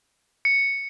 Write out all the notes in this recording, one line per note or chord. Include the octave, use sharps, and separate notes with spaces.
C#7